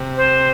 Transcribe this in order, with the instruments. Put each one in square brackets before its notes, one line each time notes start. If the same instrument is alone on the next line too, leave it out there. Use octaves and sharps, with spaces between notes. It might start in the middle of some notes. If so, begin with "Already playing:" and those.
Already playing: [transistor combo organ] C3
[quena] C5